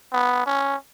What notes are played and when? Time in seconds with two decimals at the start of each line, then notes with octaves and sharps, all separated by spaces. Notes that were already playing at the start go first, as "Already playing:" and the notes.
0.13 B3
0.46 C#4